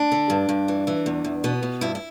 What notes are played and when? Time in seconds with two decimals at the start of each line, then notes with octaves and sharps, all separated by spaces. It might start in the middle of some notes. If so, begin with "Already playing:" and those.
Already playing: D4
0.12 D3
0.30 G2
0.49 G2
0.68 E3
0.87 E3
1.06 E2
1.24 E2
1.44 B2 B3
1.63 B2
1.81 G2 E4
1.95 E4